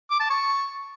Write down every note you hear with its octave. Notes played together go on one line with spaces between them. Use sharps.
D6
A5
C#6